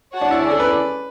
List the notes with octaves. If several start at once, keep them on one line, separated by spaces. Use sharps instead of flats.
F#4 C#5 F#5 A5
D4
E4
C#4 G#4 D5
A4
B4